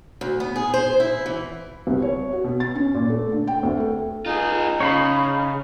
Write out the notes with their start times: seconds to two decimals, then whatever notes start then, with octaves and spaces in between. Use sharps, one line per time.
0.21 D2
0.40 B3
0.56 G#4
0.74 C5
1.00 E4
1.26 E3
1.87 C2
2.02 C#5
2.33 F#4
2.44 B2
2.60 A6
2.75 C#4
2.94 A#2
3.10 A3
3.32 D3
3.47 G5
3.63 D2
3.80 A4
4.26 D#4 F4 G#4
4.81 C#3 C#5 F5 B5